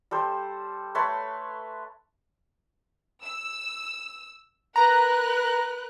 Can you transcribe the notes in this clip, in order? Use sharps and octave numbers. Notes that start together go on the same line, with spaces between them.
G3 A4 C5
A3 B4 C#5 C6
E6
A#4 B4 A#5 F#6